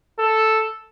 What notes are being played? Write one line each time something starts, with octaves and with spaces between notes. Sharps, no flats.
A4